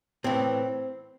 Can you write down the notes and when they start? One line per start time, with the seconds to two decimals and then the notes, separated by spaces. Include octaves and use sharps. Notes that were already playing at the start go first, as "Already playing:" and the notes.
0.24 A2 E3 C4